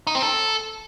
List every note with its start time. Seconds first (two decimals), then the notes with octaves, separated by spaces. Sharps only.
0.07 D#4
0.15 C4
0.22 A4